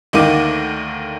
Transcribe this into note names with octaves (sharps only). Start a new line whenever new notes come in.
D2 D#3 A#3 D6 D#7